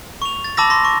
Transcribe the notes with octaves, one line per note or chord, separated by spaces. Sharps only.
C#6 F7
A6
A5 B5 D6 E6 A6 A#6
C6 A#6
C#6